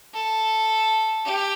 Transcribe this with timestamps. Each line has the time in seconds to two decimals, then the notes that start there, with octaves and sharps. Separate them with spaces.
0.14 A4
1.26 G4